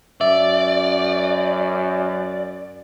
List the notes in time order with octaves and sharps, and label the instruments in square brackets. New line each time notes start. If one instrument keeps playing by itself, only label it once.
[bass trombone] F#2 [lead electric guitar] D5 [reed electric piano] E5